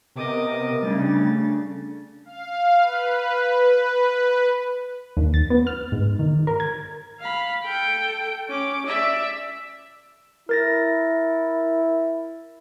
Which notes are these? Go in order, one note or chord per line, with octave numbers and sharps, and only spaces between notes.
C3 B3 A#4 D#5 D6 D#6
C#3 G3 A3 D4 A6
F5
B4
D#2
A6
B3
F6
G#2
D#3
A#4
G#6
F5 B5
A4 G5
C#4 D6
D5 E5
E4 A#4 A6 A#6